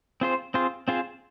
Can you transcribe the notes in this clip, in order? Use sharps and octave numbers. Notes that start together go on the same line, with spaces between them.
C4 F4 G#4 C5
C4 F4 G#4 C5
C4 F4 G#4 C5